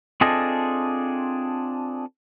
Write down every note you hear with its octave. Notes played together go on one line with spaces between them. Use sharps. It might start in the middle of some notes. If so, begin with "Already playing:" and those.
C4 D4 F4 G#4 A4 D#5